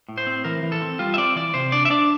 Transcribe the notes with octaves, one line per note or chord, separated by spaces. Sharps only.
A2
C5
C4
E3 A#4
E3
A4
C4
G3 F4
E5
C4 D5
E3 D5
C3 C5
D4 D5
E5
D4 D5